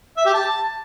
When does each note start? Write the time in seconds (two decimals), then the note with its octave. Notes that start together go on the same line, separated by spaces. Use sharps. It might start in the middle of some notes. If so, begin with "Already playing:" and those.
0.17 E5
0.26 G4
0.34 A5